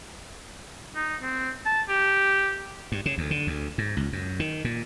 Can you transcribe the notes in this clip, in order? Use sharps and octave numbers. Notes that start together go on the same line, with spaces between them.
D#4
C4
A5
G4
G2
C#3
D2
D3
D2
G#2
C#2
F#2
D#3
A#2